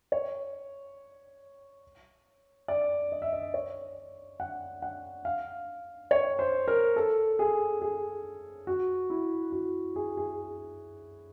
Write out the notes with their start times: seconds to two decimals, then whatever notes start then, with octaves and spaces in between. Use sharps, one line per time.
0.12 C#5
2.68 D5
3.12 D#5
3.22 E5
3.33 D#5
3.54 C#5
4.40 F#5
4.82 F#5
5.25 F5
6.11 C#5
6.39 C5
6.68 A#4
6.96 A4
7.39 G#4
7.82 G#4
8.67 F#4
9.10 E4
9.52 F#4
9.96 G#4
10.17 G#4